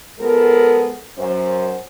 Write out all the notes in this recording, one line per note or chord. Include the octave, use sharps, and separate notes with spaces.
F3 G#3 B3 A4 A#4
F#2 C5